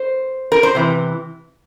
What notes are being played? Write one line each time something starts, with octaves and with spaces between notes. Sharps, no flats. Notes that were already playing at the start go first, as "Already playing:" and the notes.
Already playing: C5
A#4
C5
C3 E3